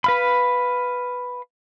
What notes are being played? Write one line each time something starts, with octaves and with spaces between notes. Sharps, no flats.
B4 F5 B5